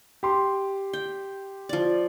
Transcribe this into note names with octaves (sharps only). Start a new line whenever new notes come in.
G4 C6
G5
F3 D5